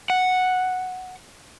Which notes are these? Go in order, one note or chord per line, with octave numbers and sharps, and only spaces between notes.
F#5